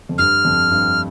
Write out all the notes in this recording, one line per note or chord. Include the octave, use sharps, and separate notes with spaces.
F2
G2 F6
F2
G2